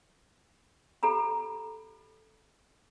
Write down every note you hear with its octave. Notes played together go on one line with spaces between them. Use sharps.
G4 A4 A#5 B5